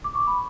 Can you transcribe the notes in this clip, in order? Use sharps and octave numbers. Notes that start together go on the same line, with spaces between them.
D6
C#6
B5